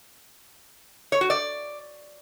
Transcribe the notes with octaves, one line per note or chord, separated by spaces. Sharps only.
C#5
F#4
D5